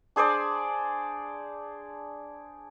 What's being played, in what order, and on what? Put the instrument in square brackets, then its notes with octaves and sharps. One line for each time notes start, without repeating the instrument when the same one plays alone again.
[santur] D4 G#4 C5 D5